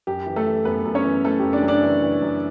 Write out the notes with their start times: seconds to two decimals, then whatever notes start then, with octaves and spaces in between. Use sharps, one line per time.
0.07 F#2 G4
0.27 E3
0.36 A3 A4
0.47 E3
0.65 F#2 B3 B4
0.85 F#2
0.95 C#4 C#5
1.04 E3
1.24 E3 A3 A4
1.39 F#2 G4
1.53 D4 D5
1.63 F#2
1.68 D4 D5
1.83 E3
2.02 E3
2.22 F#2